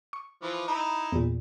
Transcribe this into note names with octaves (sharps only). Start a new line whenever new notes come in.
C#6
E3 F3
D#4 E4
E2 A#2